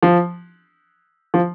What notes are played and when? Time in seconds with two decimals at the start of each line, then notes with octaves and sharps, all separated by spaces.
0.03 F3
1.34 F3